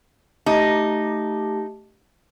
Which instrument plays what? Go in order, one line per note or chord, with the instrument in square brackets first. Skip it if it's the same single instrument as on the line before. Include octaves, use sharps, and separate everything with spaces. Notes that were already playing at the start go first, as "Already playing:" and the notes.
[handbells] A3 G4 A5 [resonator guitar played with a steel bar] D#4